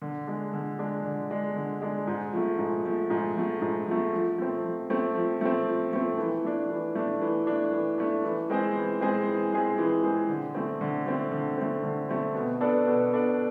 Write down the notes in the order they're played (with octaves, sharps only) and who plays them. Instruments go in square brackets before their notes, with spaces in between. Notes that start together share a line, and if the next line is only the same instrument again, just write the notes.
[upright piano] D3
G#3 D4
D3
G#3 D4
D3
G#3 D4
D3
G#3 D4
G#2
F3 A3
G#2
F3 A3
G#2
F3 A3
G#2
F3 A3
F3
A3 C4
F3
A3 C4
F3
A3 C4
F3
A3 C4
E3
A3 D4
E3
A3 D4
E3
A3 D4
E3
A3 D4
E3
G#3 C4 G#4 C5
E3
G#3 C4 G#4 C5
E3
G#3 C4 G#4 C5
E3
G#3 C4 G#4 C5
D3
A3 C4
D3
A3 C4
D3
A3 C4
D3
A3 C4
B2
B3 D4 A4 D5
B2
B3 D4 A4 D5